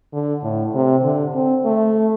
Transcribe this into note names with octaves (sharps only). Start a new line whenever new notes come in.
D3
A2
C3
D3
C4
A3